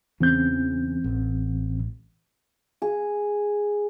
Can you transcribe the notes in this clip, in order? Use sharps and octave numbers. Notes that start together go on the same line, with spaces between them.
E2 C#3 E3 C4 G6
A1
G#4